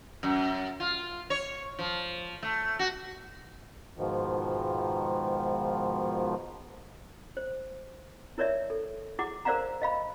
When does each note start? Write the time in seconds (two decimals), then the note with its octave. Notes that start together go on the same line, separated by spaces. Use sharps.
0.23 F#2
0.80 F4
1.30 C#5
1.79 F3
2.43 A3
2.79 F#4
3.98 G#2 B2 D#3 F3
7.37 C5
8.38 E4 A#4 C#5 D5 E5
8.70 A4
9.19 E4 G#4 F#5 D6
9.45 A#4 C5 D5 F5 F#5 A#5
9.82 D#5 F5 B5